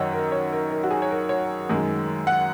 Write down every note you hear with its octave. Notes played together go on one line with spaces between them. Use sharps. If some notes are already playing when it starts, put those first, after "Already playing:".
Already playing: F#2 D#3 C#5 D#5 F#5
A#4
C#5
A#4
A#4
F#4
G#4
C#5
A#4
C#5
F#2 D#3 G#3
F#5